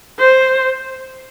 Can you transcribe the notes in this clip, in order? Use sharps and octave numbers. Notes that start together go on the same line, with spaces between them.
C5